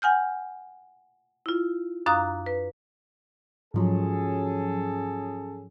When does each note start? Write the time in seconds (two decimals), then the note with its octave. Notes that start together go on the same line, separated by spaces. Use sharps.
0.02 F#5 G#5 F6 G6
1.46 E4 F4
2.06 F#2 D4 F5 A#5 D#6 F#6
2.46 B4
3.74 G#2 F3 F#3 C#4 G#4 A4